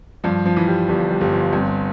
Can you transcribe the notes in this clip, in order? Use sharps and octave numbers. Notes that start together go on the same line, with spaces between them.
G2 F3
F3
E3
G3
G1 G3
G3
G1 G3
F3
G2 C4